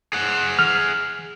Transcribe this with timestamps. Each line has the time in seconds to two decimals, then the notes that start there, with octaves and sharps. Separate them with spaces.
0.13 G#4 F#5
0.59 F6